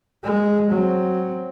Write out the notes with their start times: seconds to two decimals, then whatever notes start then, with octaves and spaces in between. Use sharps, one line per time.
0.23 G#3
0.71 F#3 C4